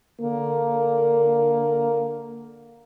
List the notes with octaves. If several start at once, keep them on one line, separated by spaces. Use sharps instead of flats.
D3 A#3